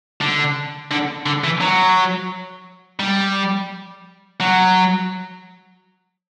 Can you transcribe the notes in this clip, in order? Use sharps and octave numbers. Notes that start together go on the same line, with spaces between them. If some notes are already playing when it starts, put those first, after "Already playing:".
D3
D3
D3
E3
F#3
G3
F#3